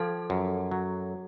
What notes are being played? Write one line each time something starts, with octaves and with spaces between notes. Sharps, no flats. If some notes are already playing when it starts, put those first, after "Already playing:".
Already playing: F3 A4
F#2
F#3